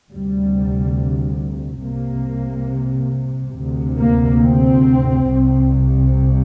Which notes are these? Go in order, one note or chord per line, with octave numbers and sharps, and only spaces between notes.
D2 C3 G3
C2 C3 A#3
D2 C3
A#3
C4
C2 C3